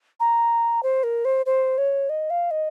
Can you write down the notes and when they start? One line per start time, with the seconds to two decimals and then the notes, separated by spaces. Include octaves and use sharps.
0.20 A#5
0.83 C5
1.03 A#4
1.25 C5
1.46 C5
1.78 C#5
2.09 D#5
2.30 F5
2.51 D#5